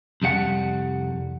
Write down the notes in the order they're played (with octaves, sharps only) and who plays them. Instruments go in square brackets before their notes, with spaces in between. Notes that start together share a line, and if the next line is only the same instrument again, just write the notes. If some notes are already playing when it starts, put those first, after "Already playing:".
[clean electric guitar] C2 F2 G3 F#5